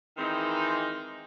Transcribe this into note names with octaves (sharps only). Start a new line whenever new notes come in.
D#3 E3 G#3 C4 D#4